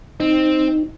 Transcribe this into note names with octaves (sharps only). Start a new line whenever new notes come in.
C4 D#4